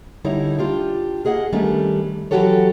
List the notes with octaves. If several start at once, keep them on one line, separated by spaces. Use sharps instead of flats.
D3 G3 D#4 E4 C#5
D4 F4 G4
A#3 G#4 D#5 F#5
D#3 G3 A3 C#4 D4
E3 F#3 F#4 G4 A4 C#5